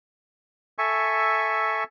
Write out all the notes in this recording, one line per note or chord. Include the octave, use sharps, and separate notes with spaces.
A4 E5 G#5 C#6